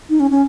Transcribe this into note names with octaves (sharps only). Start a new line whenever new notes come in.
D#4
C#4
C#4